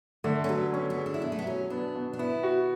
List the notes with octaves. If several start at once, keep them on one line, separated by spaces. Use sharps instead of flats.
D3 A3
C#4
F#3 B3
B3 C#4
B3
G#4
D4
E4
B2 D4
A3
B3
F#3 C#4
B3 D4
B2
D4
B3 E4
F#4